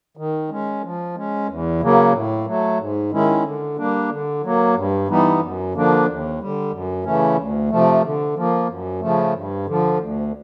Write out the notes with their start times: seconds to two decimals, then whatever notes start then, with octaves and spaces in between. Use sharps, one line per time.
0.17 D#3
0.50 G#3 C#4
0.83 F3
1.15 G#3 C#4
1.48 E2
1.80 C#3 F#3 A#3
2.13 A2
2.46 F#3 A3
2.78 G#2
3.11 D#3 G#3 C#4 E4
3.44 D3
3.77 G3 A#3 D4
4.09 D3
4.43 F#3 A#3
4.75 G2
5.08 E3 G3 B3 D#4
5.40 F#2
5.73 D3 F3 A#3 D4
6.06 D#2
6.39 D3 G3
6.71 F#2
7.04 C#3 E3 A3 C#4
7.37 D2
7.69 C3 F3 A3
8.02 D3
8.35 F3 A#3
8.68 F#2
9.01 C#3 F3 A3
9.33 G2
9.66 D3 F3
9.99 D2